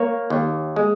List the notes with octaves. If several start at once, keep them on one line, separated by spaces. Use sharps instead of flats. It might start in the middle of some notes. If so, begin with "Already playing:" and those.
Already playing: A#3 C#5
D#2
G#3